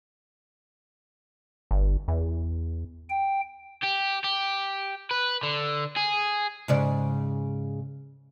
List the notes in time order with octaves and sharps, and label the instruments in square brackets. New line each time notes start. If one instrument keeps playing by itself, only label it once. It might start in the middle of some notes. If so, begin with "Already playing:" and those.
[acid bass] G1
E2
[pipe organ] G5
[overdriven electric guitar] G4
G4
B4
D3
G#4
[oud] G#2 C#3 D5